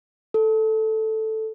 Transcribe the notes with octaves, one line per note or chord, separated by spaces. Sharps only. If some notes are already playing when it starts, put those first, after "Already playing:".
A4